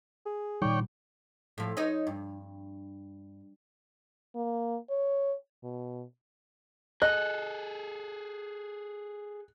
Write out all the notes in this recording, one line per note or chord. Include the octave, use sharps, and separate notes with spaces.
G#4
A#2 D#3 G3 C#5 D5 G5
A2 F3
D#4 C#5 D#5
G2
A#3
C#5
B2
G#4 A4 D#5 F#6